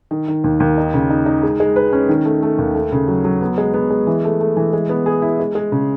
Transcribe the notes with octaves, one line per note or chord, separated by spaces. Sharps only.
D#3
D#3
D#2
D#2
D#4
C#3
D#4
D#4
G#3
G#3
B4
C#4
D#3
A3
A3
D#2
A3
C#3
F#3
F#3
B3
G#3
B3
G#3
E3
A3
A3
E3
G#3
B3
G#4
E4
G#3
G#3
C#3